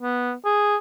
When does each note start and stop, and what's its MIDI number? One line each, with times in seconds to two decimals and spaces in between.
0.02 0.32 59
0.45 0.76 68